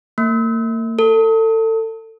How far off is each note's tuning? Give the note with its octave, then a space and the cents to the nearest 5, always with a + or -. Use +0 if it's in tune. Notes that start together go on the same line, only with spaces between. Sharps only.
A#3 -40
A4 +30